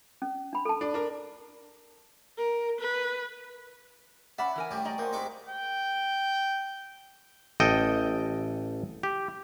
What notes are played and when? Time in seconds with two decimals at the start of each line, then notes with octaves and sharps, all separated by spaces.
0.22 C#4
0.53 D4 B5
0.65 A4 A5
0.81 D4
0.94 D4 A#4
2.38 A#4
2.81 B4
4.38 C#4 D5 E5 F#5 B5
4.56 E3 A#4 G#5
4.71 A2 G3 G4
4.85 D5 D#5 A#5
4.98 A#3 D#4 F#4 C5
5.13 G#2 C3 D#4 B5 C#6 D6
5.49 G5
7.60 A1 A4 D#5 G5
9.03 G4